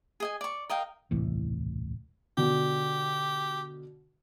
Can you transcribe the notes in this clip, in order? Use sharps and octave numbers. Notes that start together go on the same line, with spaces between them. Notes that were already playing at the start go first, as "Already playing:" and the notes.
G#4 D#5 G#5
D5 C#6
A#4 D#5 F5 G5
D#1 C2 A2 E3
B2 D3 G4